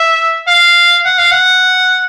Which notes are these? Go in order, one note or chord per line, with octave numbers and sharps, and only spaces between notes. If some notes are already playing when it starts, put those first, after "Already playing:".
Already playing: E5
F5
F#5
F5
F#5